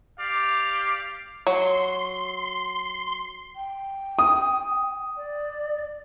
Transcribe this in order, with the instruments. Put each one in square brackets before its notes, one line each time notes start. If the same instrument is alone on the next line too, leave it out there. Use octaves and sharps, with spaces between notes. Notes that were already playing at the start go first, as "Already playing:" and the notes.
[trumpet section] G4 D5 F5
[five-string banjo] F#3 [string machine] C6
[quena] G5
[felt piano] D#6
[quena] D5